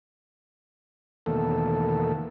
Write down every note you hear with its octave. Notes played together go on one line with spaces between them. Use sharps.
E2 B2 D#3 A3 A#3 A4